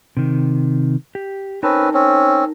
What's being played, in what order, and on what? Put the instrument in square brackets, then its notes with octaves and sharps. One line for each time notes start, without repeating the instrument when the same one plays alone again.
[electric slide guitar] C3 D#3
G4
[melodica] C4 C#4 B4 [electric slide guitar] D#4 A#4 A5
[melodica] C4 C#4